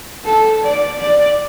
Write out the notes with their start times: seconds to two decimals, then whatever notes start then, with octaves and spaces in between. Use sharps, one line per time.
0.25 A4
0.63 D5
0.99 D5